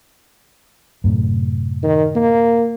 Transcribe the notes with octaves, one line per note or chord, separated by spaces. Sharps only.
F#2 A2 C3
D#3
A#3